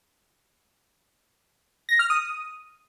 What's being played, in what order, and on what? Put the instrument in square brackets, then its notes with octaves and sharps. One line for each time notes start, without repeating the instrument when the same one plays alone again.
[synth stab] A#6
F6
D#6